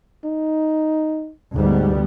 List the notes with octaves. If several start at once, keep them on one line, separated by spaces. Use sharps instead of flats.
D#4
D2 G#2 G3 B3